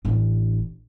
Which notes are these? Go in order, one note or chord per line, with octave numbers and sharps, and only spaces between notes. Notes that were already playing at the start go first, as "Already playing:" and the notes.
A1 D4